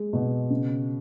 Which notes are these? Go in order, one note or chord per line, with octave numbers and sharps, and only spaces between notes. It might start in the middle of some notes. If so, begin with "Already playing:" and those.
Already playing: G#3
B2
C#3